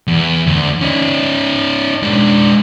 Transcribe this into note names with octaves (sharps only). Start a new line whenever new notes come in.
E2
D2
C#4 D#4
G#3 D4